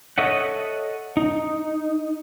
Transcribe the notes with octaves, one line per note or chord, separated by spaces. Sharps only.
A4 C#5 D#5 E5 F#5
D#4